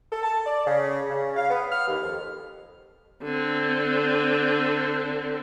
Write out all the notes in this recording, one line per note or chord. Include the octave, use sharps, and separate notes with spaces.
A4
A5
D5
C#3
C#3
F5
B3
F6
D#2
F2
D3 C4